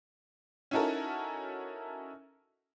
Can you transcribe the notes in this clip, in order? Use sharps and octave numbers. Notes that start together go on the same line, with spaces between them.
C#4 D#4 E4 F#4 A4 A#4